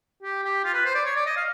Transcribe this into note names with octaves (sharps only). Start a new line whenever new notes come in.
G4
G4
F4
B4
C5
D5
C#5
D5
D#5
F5